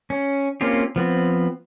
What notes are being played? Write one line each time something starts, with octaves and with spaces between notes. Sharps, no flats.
C#4
A#3 C4 C#4 F4 G4
F3 B3 C4